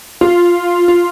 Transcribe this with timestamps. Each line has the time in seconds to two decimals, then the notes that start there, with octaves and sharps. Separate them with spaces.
0.21 F4
0.88 F4